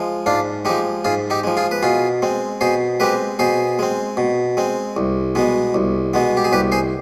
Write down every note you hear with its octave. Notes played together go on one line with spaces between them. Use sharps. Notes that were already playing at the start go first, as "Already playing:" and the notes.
Already playing: F3 G#3
G#2 D4 F4
F3 G#3 D#4 G4
G#2 F4 G#4
D#4 G4
F3 G#3
F4 G#4
B4
B2 F4 G#4
G#3 C4
B2 G#4 C5
G#3 C4 G4 B4
B2 G#4 C5
G#3 C4
B2
G#3 C4
C2
B2 G#3 B3
C2
B2 G#3 B3
G4
G#4
C2 G4 B4
G#4 C5